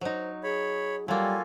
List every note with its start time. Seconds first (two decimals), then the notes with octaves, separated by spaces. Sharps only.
0.01 F#3 D#4 C5
0.43 G#4 C#5 B5
1.08 F#3 G3 A#3 F4 A4 G#5